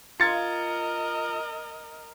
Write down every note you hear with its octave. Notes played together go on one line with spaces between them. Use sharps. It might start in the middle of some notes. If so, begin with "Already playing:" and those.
F4 A#4 D#5 G#6 A6 C#7